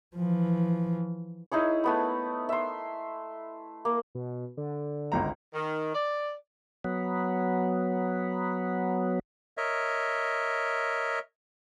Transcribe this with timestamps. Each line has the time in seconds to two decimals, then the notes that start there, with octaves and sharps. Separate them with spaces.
0.16 E3 F3
1.52 D#4 E4 G#4 C#5
1.84 A3 B3 B5
2.49 E5 C6
3.85 A#3
4.15 B2
4.57 D3
5.12 G#1 C#2 A#5
5.54 D#3
5.94 D5
6.84 F#3 B3
9.57 A#4 C#5 D#5 E5